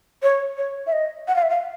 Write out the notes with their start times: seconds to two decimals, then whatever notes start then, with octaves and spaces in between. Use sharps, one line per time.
0.23 C#5
0.58 C#5
0.87 E5
0.93 D#5
1.28 F#5
1.36 F5
1.42 E5
1.50 F5